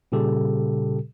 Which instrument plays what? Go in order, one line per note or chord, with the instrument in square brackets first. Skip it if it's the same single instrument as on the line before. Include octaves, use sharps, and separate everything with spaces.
[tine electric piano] A#2 C#3 G3 G4 A4